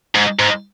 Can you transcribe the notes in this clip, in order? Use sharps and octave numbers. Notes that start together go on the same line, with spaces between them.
G#2
G#2